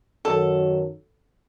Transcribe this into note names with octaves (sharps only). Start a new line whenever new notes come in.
F#2 D#3 F#3 A4